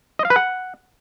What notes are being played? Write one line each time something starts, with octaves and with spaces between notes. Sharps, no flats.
D#5
F5
B4
F#5